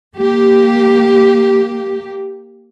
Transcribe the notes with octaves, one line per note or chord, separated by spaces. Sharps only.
A#3 G4